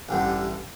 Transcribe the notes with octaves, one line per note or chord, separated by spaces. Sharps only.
A1 G2 D3